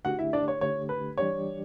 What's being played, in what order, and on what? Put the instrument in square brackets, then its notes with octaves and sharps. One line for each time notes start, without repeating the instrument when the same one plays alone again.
[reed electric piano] D3 A3 D4 G4 [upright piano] F#4 F#5
[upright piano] E4 E5
D4 D5
C#5
[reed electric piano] D3 A3 D4 G4 [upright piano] C#5
[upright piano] B4
[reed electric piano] E3 G3 D4 G4 D5 [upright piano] C#5